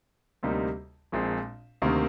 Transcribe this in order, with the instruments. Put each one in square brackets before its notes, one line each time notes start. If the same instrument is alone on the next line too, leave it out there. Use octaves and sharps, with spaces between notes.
[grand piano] D2 C3 G3 A#3 D#4
A#1 A#2 G#3 C4
D2 C3 D#3 A#3